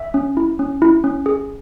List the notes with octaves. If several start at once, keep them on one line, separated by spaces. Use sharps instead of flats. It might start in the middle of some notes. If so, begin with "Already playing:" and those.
Already playing: E5
C#4
E4
C#4
E4
C#4
G#4